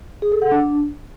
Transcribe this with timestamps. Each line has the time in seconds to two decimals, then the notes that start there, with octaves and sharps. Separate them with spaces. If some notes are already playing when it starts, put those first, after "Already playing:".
0.22 G#4
0.32 A4
0.42 F#5
0.52 D4